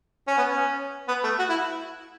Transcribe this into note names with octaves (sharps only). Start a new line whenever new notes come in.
C#4
B3
C#4
B3
A3
F#4
E4